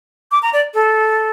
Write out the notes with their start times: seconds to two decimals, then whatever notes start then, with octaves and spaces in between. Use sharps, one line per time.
0.32 D6
0.43 A#5
0.53 D5
0.74 A4